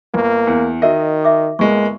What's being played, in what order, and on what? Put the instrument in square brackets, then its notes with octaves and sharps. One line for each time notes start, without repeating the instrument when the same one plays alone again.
[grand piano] G1 [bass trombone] A#3
[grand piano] E2
[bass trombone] D#3 [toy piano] F#4 A#4 E5 [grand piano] D#5
[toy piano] E5 D6
[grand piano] G1 G#3 A#3 [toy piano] C#6